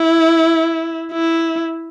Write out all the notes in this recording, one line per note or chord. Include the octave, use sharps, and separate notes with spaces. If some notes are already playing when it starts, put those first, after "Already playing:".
Already playing: E4
E4